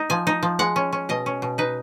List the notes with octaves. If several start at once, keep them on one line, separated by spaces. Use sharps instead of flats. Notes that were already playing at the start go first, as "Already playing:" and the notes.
Already playing: D#4
F3 G#5
D#4
F3
G#3 F#5
C#4
C#4
B2 D#5
C#4
B2
D#4 B4